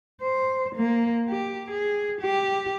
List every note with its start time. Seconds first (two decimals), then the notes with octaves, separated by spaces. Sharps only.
0.21 C5
0.76 A#3
1.29 G4
1.71 G#4
2.21 G4